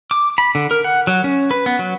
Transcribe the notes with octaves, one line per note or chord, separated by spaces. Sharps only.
D6
B5
D3
A#4
F#5
F#3
C#4
B4
B3
F#3